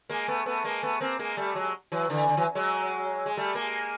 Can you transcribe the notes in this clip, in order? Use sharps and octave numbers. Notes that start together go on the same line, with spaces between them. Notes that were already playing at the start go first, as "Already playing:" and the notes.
G#3 A#3
A3 B3
A3 B3
G#3 A#3
A3 B3
A#3 C4
G#3 A#3
G3 A3
F#3 G#3
E3 F#3
D3 E3
D3
E3 F#3
F#3 G#3
G#3
G3 A3
G#3 A#3